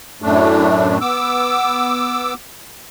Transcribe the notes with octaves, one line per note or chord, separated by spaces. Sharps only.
F#2 A2 A3 D4
B3 D6 E6